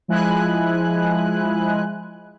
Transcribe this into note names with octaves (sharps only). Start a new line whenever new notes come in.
F3 G#3 E4 G#5 F#6